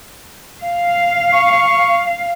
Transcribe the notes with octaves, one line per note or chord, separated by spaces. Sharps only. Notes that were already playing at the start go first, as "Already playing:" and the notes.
F5
C#6